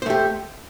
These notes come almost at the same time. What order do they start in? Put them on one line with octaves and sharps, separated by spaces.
C5 A3 G4